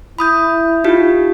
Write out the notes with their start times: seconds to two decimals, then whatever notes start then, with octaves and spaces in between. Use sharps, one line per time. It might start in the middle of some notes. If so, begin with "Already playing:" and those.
0.19 E4 B5 D#6 G6
0.84 D#4 F4 G4